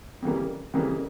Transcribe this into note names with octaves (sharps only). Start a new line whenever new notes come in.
F2 C#3 E3 G3 A#3
F2 C#3 E3 G3 A#3